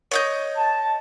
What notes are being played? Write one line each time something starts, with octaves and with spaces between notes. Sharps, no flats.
C#5 D#5 G6
A5